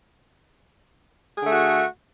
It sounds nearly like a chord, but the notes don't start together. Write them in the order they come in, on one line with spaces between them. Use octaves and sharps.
G#4 D3 A3 F#4